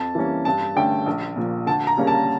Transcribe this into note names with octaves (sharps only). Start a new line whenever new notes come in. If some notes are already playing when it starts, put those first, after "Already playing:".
Already playing: F2 A5
E3 G3 A#3 C#4
G2 A5
D3 A3 C#4 G5
A#1
A#2 F3
D2 A5
A#5
C#3 G3 A#3 C#4
A5